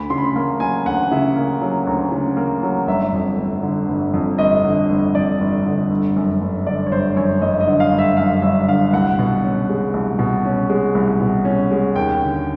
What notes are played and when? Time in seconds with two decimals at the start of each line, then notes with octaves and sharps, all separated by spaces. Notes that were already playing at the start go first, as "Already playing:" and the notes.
Already playing: D2 B5
0.10 C#3 C6
0.18 B5
0.24 C6
0.36 A#3 B5
0.60 F#3 G#5
0.85 D2 F#5
1.11 C#3 E5
1.36 A#3
1.61 F#3
1.87 D2
2.12 C#3
2.37 A#3
2.63 F#3
2.87 G1 E5
3.12 F2
3.38 G1
3.63 D3
3.89 G1
4.14 F2
4.38 G1 D#5
4.64 D3
4.90 G1
5.15 F2 D5
5.40 G1
5.65 D3
5.90 G1
6.16 F#2
6.41 G1
6.66 D3 D5
6.87 C#5
6.91 G1 C5
7.16 F#2 C#5
7.42 G1 D#5
7.60 D#5
7.67 D3
7.80 F5
7.92 G1
7.99 E5
8.17 F#2 F5
8.42 G1 E5
8.68 D3 F5
8.93 C2 F#5
9.19 B2
9.44 C#4
9.69 G#3
9.94 C2
10.19 B2
10.45 C#4
10.70 G#3
10.95 C2
11.21 B2
11.45 C#4
11.71 G#3
11.96 D#2 G5
12.21 D3